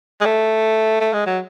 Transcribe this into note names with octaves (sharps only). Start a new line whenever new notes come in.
G#3
A3
A3
G#3
F#3